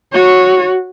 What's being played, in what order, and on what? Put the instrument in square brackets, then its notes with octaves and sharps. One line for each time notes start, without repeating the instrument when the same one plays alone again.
[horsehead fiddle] F#4 C#5